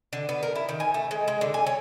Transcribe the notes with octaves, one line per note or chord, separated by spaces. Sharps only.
D3
B3
A#4
E4
D#3
G#5
A3
G#3
G#3
D3
G#5
C#5